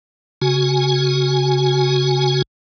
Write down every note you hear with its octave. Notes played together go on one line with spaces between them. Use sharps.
C#3 F#4 G#5